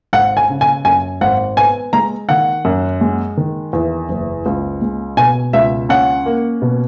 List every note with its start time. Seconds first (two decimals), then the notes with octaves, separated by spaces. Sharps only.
0.13 G#1 F#5
0.37 G#5
0.49 C#3
0.61 G#5
0.85 F#2 G#5
1.21 G#1 F#5
1.57 B3 G#5
1.93 G#3 A#5
2.29 D#3 F#5
2.65 F#2
3.01 G#3
3.37 D#3
3.73 E2
4.09 F#1
4.46 C#2
4.81 G#3
5.17 B2 G#5
5.53 C#2 E5
5.89 C#4 F#5
6.26 A#3
6.62 B2